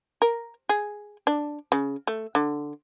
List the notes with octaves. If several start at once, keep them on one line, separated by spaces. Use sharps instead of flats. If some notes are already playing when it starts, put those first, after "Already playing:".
A#4
G#4
D4
C#3
A3
D3